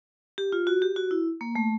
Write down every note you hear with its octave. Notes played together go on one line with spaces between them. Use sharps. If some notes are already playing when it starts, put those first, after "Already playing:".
G4
F4
F#4
G4
F#4
E4
A#3
A3